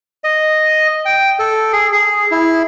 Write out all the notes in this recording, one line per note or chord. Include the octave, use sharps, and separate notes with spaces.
D#5
G5
A4
G#4
G#4
E4